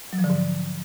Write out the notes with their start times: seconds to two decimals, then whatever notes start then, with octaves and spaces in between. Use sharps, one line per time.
0.13 F#3
0.18 F3
0.24 D3
0.30 G#2